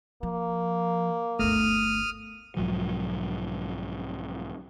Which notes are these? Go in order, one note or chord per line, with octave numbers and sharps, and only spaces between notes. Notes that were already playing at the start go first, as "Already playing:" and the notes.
F3 A#3
G1 D2 A3 D#6 F6
B1 G#2 F3 F#3